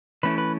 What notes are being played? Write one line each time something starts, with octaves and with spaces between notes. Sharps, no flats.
E3 A3 C#4 E4 B4
B4